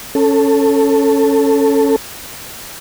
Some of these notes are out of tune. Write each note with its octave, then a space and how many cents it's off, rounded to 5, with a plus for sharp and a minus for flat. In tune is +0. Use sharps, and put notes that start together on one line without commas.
C#4 -5 A4 +10